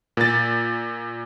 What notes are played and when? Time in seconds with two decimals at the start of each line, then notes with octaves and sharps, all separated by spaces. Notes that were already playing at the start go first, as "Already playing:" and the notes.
0.17 A#2 A6